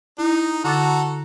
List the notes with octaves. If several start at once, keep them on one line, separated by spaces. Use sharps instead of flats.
D#4 E4
D3 F#4 A4 A#5 D6 A6